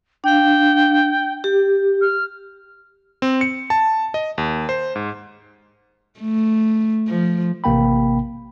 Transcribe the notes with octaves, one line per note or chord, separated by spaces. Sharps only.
D4 F5 G5
G4
F6
C4
C#7
A5
D#5
D#2
C5
G#2
A3
F3
A1 C3 A#3 G5 B5